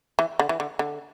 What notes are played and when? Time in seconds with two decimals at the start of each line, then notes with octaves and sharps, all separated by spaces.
0.19 E3
0.39 D3
0.49 E3
0.60 D3
0.79 D3